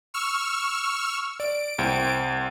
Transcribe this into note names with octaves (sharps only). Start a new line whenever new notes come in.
C#6 E6 F6
D5 D7
C2 C4